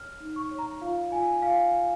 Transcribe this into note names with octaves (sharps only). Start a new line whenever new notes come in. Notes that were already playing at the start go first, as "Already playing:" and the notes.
Already playing: C#5 F6
D#4
C#6
C#5
A#5
F4 F5
F4 G#5
F4 F5